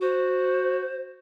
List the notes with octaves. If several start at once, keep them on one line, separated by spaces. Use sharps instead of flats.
F#4 C5